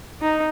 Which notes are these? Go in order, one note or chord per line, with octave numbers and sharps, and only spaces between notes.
D#4